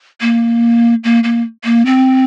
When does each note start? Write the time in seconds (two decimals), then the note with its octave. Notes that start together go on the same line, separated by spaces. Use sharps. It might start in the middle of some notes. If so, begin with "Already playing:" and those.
0.21 A#3
1.04 A#3
1.24 A#3
1.64 A#3
1.86 C4